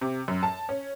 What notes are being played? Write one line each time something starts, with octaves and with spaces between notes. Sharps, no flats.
C3
F#2
A5
C#4